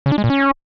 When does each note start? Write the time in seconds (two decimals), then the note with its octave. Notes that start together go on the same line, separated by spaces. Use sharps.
0.06 C#3
0.12 D4
0.18 G#3
0.24 A#2
0.30 C#4